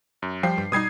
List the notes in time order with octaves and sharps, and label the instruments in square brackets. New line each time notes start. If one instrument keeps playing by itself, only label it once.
[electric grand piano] F#2
[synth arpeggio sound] F3 [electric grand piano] G3 G5 C7
[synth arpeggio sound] G2
[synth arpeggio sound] B2 G3 D#4 [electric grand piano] D#6 G#6 C7